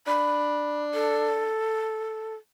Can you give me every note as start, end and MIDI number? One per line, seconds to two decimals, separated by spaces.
0.07 1.54 62
0.07 0.81 83
0.94 2.34 69